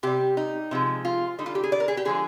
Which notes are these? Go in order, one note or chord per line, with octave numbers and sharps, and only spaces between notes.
C3 G3 G4
D#4
C3 F3 G#3
F4
D3 G3 D#4
F4
G4
G#4
D5
A#4
G#4
G4
D3 F3 G#3 G#4